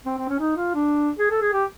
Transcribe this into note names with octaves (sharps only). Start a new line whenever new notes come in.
C4
C4
C#4
D#4
F4
D4
G#4
A4
G#4
G4